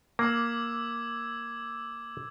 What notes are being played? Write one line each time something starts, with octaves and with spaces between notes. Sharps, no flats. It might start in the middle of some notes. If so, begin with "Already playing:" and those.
A#3 D6 E6 G#6